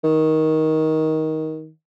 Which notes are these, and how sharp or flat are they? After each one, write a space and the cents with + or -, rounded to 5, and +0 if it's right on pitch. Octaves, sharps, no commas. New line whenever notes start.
D#3 +15